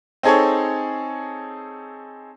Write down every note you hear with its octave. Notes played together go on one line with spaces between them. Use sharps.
C4 D#4 G#4 A4 C#5